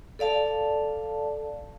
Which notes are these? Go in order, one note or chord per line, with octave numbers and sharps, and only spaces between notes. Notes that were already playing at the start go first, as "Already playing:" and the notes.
A4 D5 F5 A5